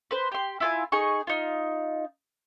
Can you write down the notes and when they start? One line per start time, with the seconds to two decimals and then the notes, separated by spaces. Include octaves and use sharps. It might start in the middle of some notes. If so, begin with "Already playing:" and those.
0.11 B4 C5
0.32 G4 C6
0.60 E4 F4 G#5
0.92 D#4 G#4 C#6
1.27 D#4 F4